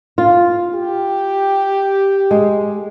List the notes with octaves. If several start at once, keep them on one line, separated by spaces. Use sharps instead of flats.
F4
G4
G#3